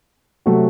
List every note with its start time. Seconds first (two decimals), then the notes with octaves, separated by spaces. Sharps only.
0.46 C3 F#3 A3 C4 F#4